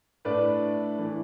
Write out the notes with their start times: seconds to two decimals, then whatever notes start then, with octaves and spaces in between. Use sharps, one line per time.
0.25 A2 A3 D4 B4 D5
0.98 E3 A3 D4